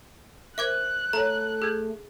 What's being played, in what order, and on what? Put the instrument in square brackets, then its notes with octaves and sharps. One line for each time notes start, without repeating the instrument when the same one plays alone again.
[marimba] A#4 C5 [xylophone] E5 D6 G#6 [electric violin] F#6
[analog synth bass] A3 [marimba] A4 C#5 [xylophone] A#5
[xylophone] G#4 [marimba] E6 G6 G#6